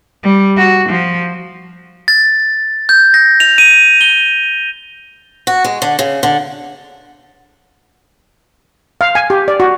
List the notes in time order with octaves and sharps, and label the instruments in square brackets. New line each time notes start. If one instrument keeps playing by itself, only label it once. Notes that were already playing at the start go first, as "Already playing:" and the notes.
[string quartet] G3
F#4
F3
[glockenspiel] A6
G6
A#6
F7
D#7
G7
[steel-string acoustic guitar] F#4
G#3
D3
C#3
D3
[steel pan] F5
G#5
G4
D5
F#4